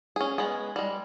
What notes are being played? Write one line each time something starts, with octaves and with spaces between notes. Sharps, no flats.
C#4 G#4
G#3 B3 G#4
G3 G#3